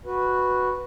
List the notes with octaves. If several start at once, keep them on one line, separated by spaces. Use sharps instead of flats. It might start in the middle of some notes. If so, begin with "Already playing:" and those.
F#4 B4